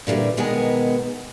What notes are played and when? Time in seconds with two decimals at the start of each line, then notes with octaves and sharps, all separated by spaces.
0.07 A#2 D3 E3 G3
0.37 B2 D#3 G#3 B3 G#4 A#4